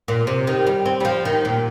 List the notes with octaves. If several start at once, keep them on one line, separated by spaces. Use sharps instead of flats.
A#2
C3
D#3
G3
C4
G3
F3
D#3
A#2